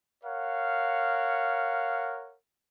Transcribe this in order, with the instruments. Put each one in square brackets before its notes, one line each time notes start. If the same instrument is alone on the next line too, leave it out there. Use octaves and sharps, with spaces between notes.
[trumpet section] A#4 C#5 F5 F#5